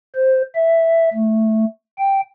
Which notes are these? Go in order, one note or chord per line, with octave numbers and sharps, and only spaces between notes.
C5
E5
A3
G5